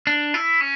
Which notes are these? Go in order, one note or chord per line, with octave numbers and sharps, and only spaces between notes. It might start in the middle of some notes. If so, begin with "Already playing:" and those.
D4
E4
C#4